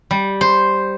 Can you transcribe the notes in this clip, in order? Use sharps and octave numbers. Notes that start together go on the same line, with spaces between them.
G3
C5